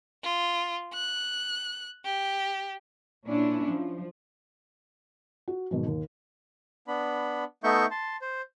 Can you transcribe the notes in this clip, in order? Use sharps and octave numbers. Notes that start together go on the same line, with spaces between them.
F4
F#6
G4
A#2 C#4 D4 E4
F3
F#4
G#2 B2 D#3 F#3
D#2
B3 D4 B5
A3 B3 D#4 E5 C#6 G6
A5 C6
C5